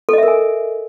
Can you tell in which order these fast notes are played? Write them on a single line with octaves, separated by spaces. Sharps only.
A4 D#5 E5 A#4 G#5